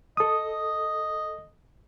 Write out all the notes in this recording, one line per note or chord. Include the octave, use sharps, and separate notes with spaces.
A4 D#5 D#6